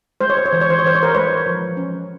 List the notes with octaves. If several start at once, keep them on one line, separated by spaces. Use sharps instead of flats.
G#3 C5
C#5
C5
C#5
E3 C5
C#5
C5
C#5
E3 C5
C#5
A#4 C5
G#3 B4 C#5
F3
C#4